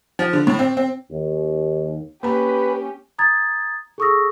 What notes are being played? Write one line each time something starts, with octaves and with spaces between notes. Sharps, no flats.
F3
D3
A2
C4
C4
D#2
A#3 C#4 G4 B4 A#5
A#5 D#6 G#6 A6
G#4 A4 C#6 D#6 E6 A#6